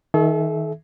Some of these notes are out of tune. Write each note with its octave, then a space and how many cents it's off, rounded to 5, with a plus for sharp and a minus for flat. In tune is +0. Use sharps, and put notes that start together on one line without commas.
D#3 +20 A4 -45 E5 +0